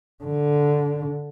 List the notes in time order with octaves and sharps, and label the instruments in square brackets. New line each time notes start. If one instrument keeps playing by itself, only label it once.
[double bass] D3